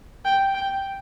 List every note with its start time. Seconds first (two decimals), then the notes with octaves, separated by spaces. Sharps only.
0.25 G5
0.54 G5